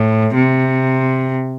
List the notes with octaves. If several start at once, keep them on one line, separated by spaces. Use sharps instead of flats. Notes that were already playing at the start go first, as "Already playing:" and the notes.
Already playing: A2
C3